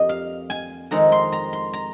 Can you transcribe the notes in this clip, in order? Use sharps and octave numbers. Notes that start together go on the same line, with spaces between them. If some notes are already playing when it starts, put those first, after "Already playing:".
Already playing: F2 A#3 G4 D#5
F5
G#5
F2 D#3 G#3 C4 D#4 A#5
C6
A#5
C6
A#5